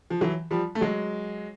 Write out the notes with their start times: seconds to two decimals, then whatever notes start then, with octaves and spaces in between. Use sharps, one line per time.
0.10 F3
0.21 E3 F#3
0.51 F3 G3
0.75 A3
0.81 F#3 G#3